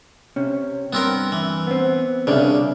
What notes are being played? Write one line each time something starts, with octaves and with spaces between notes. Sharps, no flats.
C3 C#4
G2 B3 C4 A#4
E3
B3 C4
C2 C#3 D4 G#4 D5